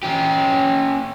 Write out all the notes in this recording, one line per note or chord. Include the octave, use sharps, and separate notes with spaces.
C#4 G4